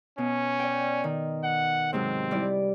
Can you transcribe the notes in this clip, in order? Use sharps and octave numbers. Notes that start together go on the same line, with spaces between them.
B2 C#4
D5 G5
D#3
F#5
G#2 C3 F#3 C4
G3 E4 D5